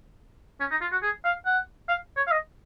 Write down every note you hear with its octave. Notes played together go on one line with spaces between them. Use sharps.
C#4
D#4
F4
F#4
G#4
F5
F#5
F5
C#5
F5
D#5